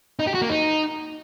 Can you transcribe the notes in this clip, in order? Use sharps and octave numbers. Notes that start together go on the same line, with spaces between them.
D#4
G4
F#4
A#3
D#4